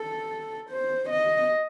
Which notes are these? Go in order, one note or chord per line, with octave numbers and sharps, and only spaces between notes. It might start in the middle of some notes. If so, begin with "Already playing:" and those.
Already playing: A4
C5
D#5